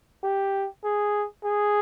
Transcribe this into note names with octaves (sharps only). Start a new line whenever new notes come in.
G4
G#4
G#4